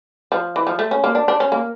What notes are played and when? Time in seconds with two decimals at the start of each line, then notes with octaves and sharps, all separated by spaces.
0.32 F3
0.56 E3
0.67 F3
0.79 A3
0.91 C#4
1.04 A#3
1.15 D4
1.28 D4
1.40 C#4
1.52 A#3